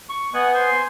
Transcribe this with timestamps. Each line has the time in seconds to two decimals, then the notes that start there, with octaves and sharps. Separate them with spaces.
0.09 C#6
0.34 B3 D#5 F#5 G#5
0.54 C5 G#5 C6